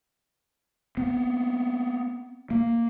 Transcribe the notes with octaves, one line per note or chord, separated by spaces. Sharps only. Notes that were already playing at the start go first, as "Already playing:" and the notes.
B3 C4
A#3